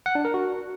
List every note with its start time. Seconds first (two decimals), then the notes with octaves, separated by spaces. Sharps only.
0.06 F#5
0.15 D4
0.25 A#4
0.34 F#4